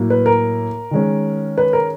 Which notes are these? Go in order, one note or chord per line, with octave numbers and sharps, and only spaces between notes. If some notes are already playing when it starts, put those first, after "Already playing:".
Already playing: A2 F#3 A#3
B4
A#4
D#3 G#3 C#4
B4
A#4